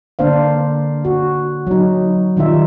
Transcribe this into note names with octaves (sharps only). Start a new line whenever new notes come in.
D3 A#3 D4 C5 F5
F#4
F#3 D#4
D#3 G3 D#4 F4 E5